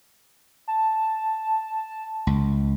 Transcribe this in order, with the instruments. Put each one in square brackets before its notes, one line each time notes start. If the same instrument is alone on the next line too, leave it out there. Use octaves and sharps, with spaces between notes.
[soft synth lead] A5
[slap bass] C#2